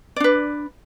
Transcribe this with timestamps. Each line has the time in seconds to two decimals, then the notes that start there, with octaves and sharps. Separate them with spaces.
0.16 D5
0.20 D4
0.24 B4